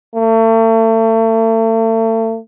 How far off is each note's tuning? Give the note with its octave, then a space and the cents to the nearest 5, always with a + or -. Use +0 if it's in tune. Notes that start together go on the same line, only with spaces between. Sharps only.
A3 +35